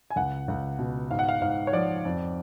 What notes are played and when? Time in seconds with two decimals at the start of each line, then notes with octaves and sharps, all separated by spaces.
0.10 G#5
0.16 C#2 F#5
0.48 C#2
0.79 B2
1.11 G#2 F5
1.19 F#5
1.29 F5
1.42 G#2 F5
1.67 C#5
1.73 F3 D5
2.05 F2